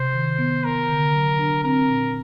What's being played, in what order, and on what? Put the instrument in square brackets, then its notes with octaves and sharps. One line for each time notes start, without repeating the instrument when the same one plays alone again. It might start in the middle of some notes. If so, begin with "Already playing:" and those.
Already playing: [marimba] C3 [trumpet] C5
[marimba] D#3
B3
[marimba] B3 [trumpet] A#4
[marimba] D3
F#3
D4
[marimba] C4 [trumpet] A#4
[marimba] A#2